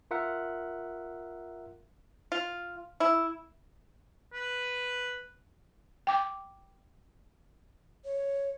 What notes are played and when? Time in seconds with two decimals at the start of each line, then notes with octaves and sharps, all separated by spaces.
0.11 F4 A#4 E5 F#5
2.32 F4
3.00 E4
4.33 B4
6.07 G5 D6
8.05 C#5